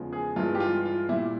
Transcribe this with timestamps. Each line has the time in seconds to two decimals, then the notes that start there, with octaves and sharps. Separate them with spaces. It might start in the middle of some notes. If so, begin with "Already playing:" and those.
Already playing: E2 C#3 F3 G#3
0.13 G#4
0.36 G2 E3 G#3 F4
0.55 G4
0.60 F4
0.85 F4
1.09 A#2 G3 E4